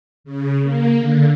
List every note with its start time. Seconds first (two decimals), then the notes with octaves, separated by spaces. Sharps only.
0.24 C#3
0.63 A#3
0.99 D3